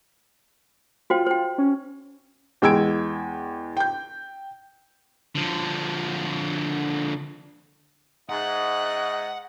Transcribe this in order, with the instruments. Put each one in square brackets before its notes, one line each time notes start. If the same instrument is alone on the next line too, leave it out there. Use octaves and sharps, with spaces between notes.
[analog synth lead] F4 [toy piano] F#4 C5 G5
[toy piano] C5 G5
[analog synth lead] C#4
[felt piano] E2 G#3 G5 E6 G#6 D7
G5 G6
[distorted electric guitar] D3 F3
[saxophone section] G#2 [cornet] D#5 [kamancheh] E5 F#6 [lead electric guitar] F#5